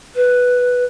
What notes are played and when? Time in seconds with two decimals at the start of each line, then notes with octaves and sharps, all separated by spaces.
0.15 B4